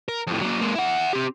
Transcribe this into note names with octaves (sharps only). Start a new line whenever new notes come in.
A#4
F2 A2
F#3 A#3
G#3 A#3
E4 F#5
C4 G4